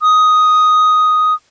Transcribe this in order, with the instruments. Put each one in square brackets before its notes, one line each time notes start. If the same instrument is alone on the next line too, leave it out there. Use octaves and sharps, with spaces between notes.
[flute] D#6